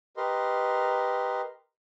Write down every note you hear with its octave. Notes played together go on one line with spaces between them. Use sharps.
G4 A#4 B4 D#5 C6